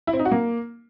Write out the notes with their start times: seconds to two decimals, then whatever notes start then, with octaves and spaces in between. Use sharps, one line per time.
0.07 E4
0.13 C4
0.19 D#4
0.25 F#4
0.31 A#3